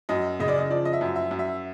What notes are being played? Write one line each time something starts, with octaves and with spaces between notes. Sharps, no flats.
F#2 D#5
C#3 D#5
D5
D#5
F3 D5
D#5
E5
F#2
E5
F#2
E5